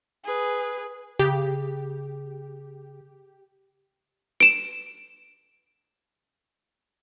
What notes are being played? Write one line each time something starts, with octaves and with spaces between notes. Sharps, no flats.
G#4 B4
C#3 G4
D7 E7